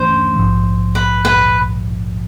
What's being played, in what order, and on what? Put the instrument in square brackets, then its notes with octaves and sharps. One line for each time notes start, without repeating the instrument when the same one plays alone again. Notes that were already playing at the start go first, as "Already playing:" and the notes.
Already playing: [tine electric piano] G2 E3 A3 C#4 [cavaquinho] C5
[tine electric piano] A#1 G#2 F3
[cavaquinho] B4
B4